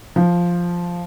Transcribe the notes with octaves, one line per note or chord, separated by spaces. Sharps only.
F3